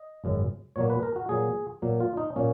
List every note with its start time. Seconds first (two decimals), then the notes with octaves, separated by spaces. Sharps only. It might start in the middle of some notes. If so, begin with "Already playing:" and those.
Already playing: D#5
0.24 G#1 F#2 C#3
0.76 A#2 F#3 A#3 C#5
0.90 B4
1.03 A#4
1.16 F#4
1.29 A#2 F#3 A#3 G#4
1.82 A#2 F#3 A#3
2.00 F4
2.17 D#4
2.36 A#2 F#3 A#3 C#4